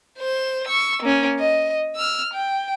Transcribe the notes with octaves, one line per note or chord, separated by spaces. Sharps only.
C5 E7
C#6 E6
A#3 C#4
D#5
E6 F6
G5